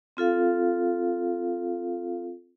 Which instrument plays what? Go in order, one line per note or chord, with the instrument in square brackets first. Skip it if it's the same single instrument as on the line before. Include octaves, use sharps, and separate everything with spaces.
[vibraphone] C4 F4 A4 F5